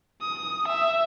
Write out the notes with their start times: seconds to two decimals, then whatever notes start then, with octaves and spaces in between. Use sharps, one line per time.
0.22 D#6
0.68 E5